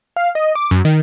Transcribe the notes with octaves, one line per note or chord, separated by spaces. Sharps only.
F5
D#5
D6
F#2
D#3